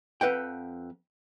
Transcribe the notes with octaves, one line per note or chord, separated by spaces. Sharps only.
F2 B4 F#5 G5